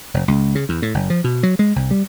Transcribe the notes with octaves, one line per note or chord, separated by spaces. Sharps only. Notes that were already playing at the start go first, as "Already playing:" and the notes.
F1
C#2
C#3
E2
A2
F#1
F3
B2
F#3
G#3
C2
G3